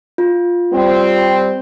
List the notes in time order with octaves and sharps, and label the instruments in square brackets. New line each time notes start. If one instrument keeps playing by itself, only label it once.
[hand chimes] F4
[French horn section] G3 C4